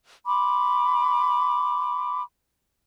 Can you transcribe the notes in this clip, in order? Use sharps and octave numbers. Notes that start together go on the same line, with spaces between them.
B5 C6 D6